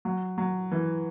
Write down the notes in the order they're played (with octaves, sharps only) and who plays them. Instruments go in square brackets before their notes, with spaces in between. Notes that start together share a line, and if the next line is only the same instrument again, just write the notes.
[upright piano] F#3
F#3
E3